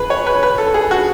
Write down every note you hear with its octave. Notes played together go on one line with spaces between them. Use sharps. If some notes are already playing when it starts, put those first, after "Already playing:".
Already playing: G#4 B4
C#5
B4
B4
A4
G#4
F#4